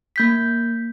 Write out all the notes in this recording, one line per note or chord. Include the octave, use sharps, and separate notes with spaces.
A#3 G6 B6